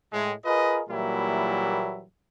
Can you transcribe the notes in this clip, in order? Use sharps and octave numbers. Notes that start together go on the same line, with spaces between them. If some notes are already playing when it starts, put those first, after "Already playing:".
A2 G#3
F4 G#4 A#4 B4 D#5
A#2 E3 F#3 G3 A#3 E4